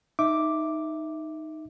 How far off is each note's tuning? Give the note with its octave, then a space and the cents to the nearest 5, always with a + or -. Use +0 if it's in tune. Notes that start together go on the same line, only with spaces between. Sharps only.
D#4 +0 E5 +0 D6 +0